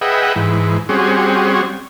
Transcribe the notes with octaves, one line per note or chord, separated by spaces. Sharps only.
G#4 B4 D#5 E5 F#5 G5
G#2 E3
G3 C4 C#4 F#4 G#4